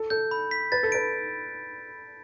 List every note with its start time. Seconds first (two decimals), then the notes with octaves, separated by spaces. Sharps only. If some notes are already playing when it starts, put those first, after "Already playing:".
Already playing: A4
0.10 A4 G6
0.31 B5
0.51 B6
0.72 B4 A6
0.83 A4
0.92 B4 D7